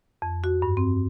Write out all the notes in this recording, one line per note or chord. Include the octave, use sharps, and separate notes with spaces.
F2
F#4
G2
C4